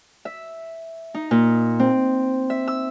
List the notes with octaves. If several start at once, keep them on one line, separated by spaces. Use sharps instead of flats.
E5
D#4
A#2
C4
E5
E6